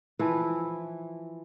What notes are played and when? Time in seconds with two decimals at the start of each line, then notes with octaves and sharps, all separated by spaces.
0.19 E3 F3 E4 B4